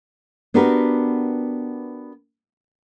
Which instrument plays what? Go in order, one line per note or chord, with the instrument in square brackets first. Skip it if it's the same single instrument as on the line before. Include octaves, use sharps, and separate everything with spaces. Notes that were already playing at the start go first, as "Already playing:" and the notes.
[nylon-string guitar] B3 D4 F#4 G4 A#4 B4